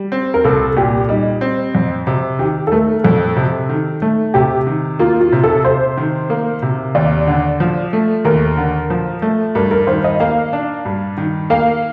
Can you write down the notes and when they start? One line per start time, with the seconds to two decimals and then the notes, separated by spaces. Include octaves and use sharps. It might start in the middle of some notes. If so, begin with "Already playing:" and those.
Already playing: G3
0.12 C4
0.34 A#4
0.44 C2 A4
0.76 A#2 G4
1.09 G3 D#4
1.41 C4
1.75 F2
2.07 C3
2.39 D#3 G4
2.67 A4
2.71 A3 A#4
3.04 F2 A4
3.37 C3
3.69 D#3
4.02 A3
4.34 C3 G4
4.67 D#3
4.99 A#3 F4
5.21 F4
5.32 C3
5.44 A4
5.65 C3 C5
5.97 D#3
6.30 A#3
6.63 C3
6.95 D#2 D5
7.27 D3
7.60 F3
7.93 A3
8.25 D#2 A#4
8.57 D3
8.90 F3
9.22 A3
9.55 G2 A#4
9.71 A#4
9.87 D#3 C5
10.04 D#5
10.20 A#3 F5
10.53 D4
10.85 G2
11.18 D#3
11.50 A#3 F5